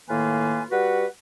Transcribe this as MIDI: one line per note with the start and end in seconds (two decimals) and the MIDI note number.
0.09 0.63 45
0.09 0.63 51
0.09 0.63 58
0.09 0.63 65
0.09 0.63 71
0.09 0.63 80
0.71 1.06 55
0.71 1.06 66
0.71 1.06 71
0.71 1.06 78